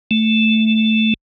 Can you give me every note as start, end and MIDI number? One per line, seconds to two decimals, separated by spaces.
0.11 1.14 57